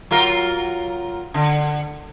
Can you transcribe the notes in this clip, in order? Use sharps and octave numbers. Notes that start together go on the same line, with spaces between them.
F#3 F4 A#4
D3